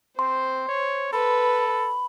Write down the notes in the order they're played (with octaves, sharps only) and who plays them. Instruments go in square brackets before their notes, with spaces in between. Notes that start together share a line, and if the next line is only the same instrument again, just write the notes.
[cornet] C4 [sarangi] C5 [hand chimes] C6
[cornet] C#5
[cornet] A4 [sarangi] B4 [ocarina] B5